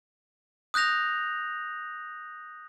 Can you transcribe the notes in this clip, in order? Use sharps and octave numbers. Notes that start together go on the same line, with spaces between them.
D#6 F#6 G6 A#6 F7